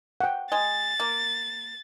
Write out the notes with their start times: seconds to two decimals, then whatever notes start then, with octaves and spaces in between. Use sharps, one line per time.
0.21 F#5 G5
0.52 G#3 A6
1.00 A#3